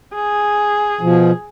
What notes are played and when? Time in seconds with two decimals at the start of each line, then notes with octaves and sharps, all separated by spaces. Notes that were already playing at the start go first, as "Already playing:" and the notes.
0.15 G#4
1.01 B2 F3